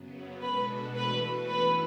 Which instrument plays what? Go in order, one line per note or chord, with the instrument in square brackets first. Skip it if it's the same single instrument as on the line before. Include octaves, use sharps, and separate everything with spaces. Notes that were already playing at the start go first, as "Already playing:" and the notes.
Already playing: [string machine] F#2 C#3 F#3 B3
[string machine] B2 G#3 D4 F#4 A4 [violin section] B4
[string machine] E3 A3 D4 F#4 A4 [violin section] B4
[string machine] F#2 E3 B3 E4 A4 [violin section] B4